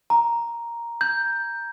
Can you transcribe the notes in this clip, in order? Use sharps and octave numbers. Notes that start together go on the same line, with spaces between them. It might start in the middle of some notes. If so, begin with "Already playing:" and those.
A#5
G6